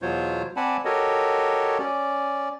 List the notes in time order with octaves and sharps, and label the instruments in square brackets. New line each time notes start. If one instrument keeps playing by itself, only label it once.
[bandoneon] E2 B2 F#3 F4 C5 C#5
C4 D5 F#5 G#5 A5 B5
F#4 G4 A4 A#4 C#5 D#5
C#4 D5